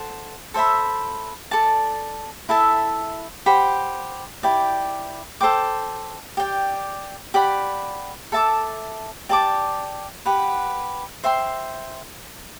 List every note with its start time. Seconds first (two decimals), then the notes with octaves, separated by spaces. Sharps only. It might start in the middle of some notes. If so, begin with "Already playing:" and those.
Already playing: A4 C5 F#5
0.54 A4 C5 E5 B5
1.51 A4 D5 A5
2.49 E4 A4 E5 A5
3.46 G4 C5 F#5 B5
4.43 E4 G4 D5 G5
5.40 A4 C5 G5 D6
6.37 G4 D5 G5
7.34 G4 D5 F#5 B5
8.32 A4 E5 A5 D6
9.29 G4 D5 A5 D6
10.25 G4 B4 F#5
11.24 C5 E5 G5 C6